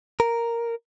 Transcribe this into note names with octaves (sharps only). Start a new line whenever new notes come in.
A#4